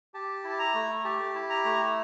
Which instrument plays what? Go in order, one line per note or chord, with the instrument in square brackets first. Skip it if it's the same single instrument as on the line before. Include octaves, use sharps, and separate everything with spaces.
[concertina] G4 A5
E4
A5
A#5
A3
G4 A5
E4
A#5
A3